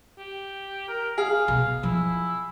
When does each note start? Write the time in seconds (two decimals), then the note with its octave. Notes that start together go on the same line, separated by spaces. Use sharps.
0.18 G4
0.88 A#4
1.18 G#4 F5
1.48 B2
1.83 F3 E4